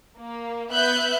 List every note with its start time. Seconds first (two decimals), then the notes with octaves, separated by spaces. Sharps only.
0.19 A#3
0.72 B3 E5 F#6 G6